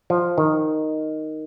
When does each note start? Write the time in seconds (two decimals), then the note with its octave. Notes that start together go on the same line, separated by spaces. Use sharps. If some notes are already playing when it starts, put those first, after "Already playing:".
0.10 F3
0.38 D#3